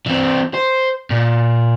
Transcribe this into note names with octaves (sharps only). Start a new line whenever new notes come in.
E3 C4
C5
A#2